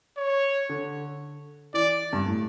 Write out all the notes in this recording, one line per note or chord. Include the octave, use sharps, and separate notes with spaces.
C#5
D3
E3 D5
G2
A2